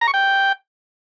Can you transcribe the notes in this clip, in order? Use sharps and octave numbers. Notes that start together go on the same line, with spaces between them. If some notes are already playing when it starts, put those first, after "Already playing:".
A#5
C#6
G5